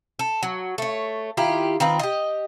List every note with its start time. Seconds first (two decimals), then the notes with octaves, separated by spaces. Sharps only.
0.19 A4
0.43 F#3
0.78 A3 C#5
1.37 D#3 E4 F4 G4
1.80 D#3 C4 F4 B4
1.99 G4 D#5